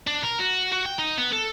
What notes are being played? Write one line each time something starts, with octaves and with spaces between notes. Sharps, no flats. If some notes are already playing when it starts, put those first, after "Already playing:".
D4
A#4
F#4
F#4
G5
D#4
B3
A4